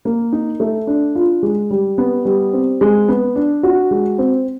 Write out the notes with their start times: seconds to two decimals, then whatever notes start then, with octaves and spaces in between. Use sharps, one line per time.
0.05 A#3
0.32 D#4
0.60 A3
0.87 D4
1.15 F4
1.43 G#3
1.70 G3
1.98 B3
2.25 G3
2.53 C4
2.81 G#3
3.08 B3
3.36 D4
3.63 F#4
3.91 G#3
4.18 C4